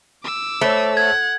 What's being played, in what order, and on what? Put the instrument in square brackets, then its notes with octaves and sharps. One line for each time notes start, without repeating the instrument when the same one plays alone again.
[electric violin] D6 E6
[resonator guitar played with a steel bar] A3 [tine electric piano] C5 C#5
[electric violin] F#5 [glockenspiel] G#6